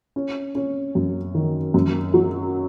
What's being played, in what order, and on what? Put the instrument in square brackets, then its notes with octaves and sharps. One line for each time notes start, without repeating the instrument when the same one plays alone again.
[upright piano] C#4
C#4
F#2
D#3
F#2
F#3